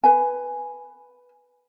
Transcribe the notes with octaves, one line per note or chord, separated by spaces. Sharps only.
B4 G#5